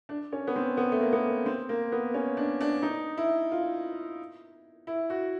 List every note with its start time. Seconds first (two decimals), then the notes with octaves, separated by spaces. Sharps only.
0.09 D4
0.33 C#4
0.47 B3
0.56 C4
0.77 B3
0.92 A3
1.01 A#3
1.13 B3
1.46 C4
1.69 A#3
1.92 B3
2.14 C#4
2.37 D4
2.61 D4
2.82 D#4
3.17 E4
3.52 F4
4.87 E4
5.10 F#4